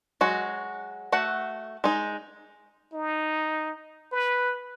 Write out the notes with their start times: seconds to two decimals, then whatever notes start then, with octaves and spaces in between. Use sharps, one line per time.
0.21 F#3 G#3 F#4
1.12 A3 F#4 F#5
1.84 G#3 D#4
2.93 D#4
4.12 B4